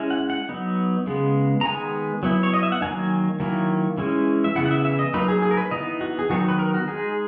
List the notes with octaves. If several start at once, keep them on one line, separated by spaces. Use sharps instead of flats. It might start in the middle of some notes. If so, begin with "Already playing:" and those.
Already playing: G#3 C#4 E4
F#5
F#5
F#3 B3 D#4
C#3 G#3 B3
A#5
D#3 G#3 B3 G#5
F#3 B3 E4
C#5
D#5
E5
F#5
D#3 F#3 A#3 D#4 G#5
D#3 F#3 A#3 E4
E3 G#3 C#4 E4
E5
C#3 E3 B3 E4 F#5
F#5
E5
E5
D#5
F#3 A#3 D#4 B4
G#4
G#4
A#4
B4
E3 B3 D#4 D#5
F#4
G#4
D#3 F#3 B3 D#4 F#4
B4
A#4
F#4
G#3 D#4 G#4